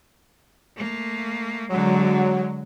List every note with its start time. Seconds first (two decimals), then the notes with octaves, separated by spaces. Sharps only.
0.77 A3 A#3
1.69 D3 F#3 G#3